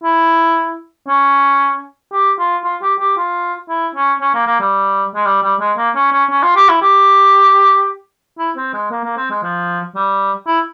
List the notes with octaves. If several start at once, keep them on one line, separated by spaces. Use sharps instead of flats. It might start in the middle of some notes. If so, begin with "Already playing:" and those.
E4
C#4
G4
F4
F4
G4
G4
F4
E4
C#4
C#4
A#3
A#3
G3
G#3
G3
G3
G#3
A#3
C#4
C#4
C#4
F4
G4
E4
G4
E4
C4
G#3
A#3
A#3
C4
G#3
F3
G3
E4